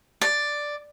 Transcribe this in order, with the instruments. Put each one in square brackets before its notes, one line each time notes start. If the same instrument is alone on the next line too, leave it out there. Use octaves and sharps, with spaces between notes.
[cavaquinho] D5